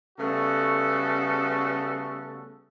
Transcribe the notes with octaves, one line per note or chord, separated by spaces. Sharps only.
C#3 G3 A3 B3 F#4 A4